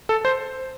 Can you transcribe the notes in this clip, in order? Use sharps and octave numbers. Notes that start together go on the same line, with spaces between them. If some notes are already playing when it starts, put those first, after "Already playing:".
A4
C5